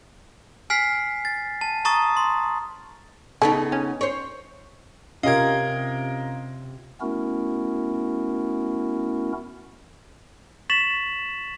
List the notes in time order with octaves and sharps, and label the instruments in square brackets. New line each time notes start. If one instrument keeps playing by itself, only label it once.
[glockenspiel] G#5 F6 B6 C7
A6
A5
A5 A#5 C#6 D#6 A6
C6
[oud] C#3 B3 D#4 [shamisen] A4
[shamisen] C#4
[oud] C5 C#5
[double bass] C3 [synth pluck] C#4 F4 G4 [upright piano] A#4 D#5 [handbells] F5 G#6
[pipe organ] A3 B3 C#4 E4 F#4 A#4
[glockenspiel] C#6 A6 B6 E7 F#7